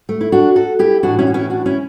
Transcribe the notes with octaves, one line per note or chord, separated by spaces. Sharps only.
A3
E4
D4 F#4
F#4 A4
E4 G4
A2 E3 D4 F#4
C#4 E4
F#4
C#4 E4
D4 F#4
C#4 E4